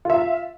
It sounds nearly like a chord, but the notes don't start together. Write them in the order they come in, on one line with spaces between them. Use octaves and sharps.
F4 E5 F5